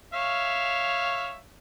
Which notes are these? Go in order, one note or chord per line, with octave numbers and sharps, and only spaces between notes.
C#5 E5 F5